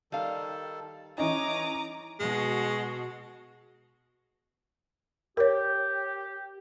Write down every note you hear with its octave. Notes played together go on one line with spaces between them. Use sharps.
D#3 G3 A4 F5
E3 C#4 D#4 C#5 A#5 D6 D#6
B2 G#3 F#4
G4 A#4 C#5